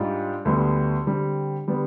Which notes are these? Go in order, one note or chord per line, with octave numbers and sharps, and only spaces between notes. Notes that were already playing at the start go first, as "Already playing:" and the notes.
Already playing: G#2 G3 D4 F4
D2 D3 G3 B3
D3 G3 C4
D3 G3 B3